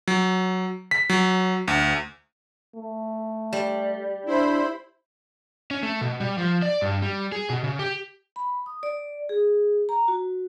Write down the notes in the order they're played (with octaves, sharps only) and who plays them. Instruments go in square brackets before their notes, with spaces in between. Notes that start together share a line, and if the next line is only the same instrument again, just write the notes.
[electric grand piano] F#3
B6
F#3
D2
[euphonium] A3
[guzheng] G3
[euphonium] D4 [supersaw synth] E4 C5 B5
[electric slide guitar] C#4
A3
B2
G3
F3
D5
G2
G3
G#4
B2
C#3
G4
[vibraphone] B5
D#6
D5
G#4
A#5
F#4